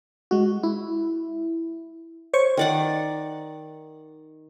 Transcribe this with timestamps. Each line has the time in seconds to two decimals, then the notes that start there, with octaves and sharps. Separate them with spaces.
0.31 G#3 F#4
0.63 E4
2.34 C5 C#5 C#6
2.57 D#3 D5 F#5